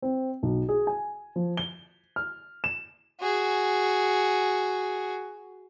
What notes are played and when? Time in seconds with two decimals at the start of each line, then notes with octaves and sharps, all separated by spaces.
0.02 C4
0.43 B1
0.69 G#4
0.87 G#5
1.36 F3
1.57 G7
2.16 F6
2.64 E7
3.21 F#4 G#4